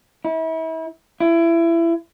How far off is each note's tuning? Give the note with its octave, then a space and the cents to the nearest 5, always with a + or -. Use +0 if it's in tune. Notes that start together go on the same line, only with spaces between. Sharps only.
E4 -35
E4 +25